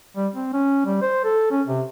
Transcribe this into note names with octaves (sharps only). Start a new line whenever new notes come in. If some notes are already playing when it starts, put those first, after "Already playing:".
G3
C4
C#4
G3
C5
A4
C#4
C3